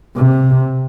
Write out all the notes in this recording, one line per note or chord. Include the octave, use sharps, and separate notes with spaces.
C3